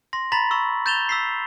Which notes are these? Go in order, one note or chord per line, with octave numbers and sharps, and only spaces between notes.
C6 A#6
A#5 B5 A6 B6 F#7
A#5 B5 C#6 E6
G6 A6 E7 F7 G7
E6 B6 C7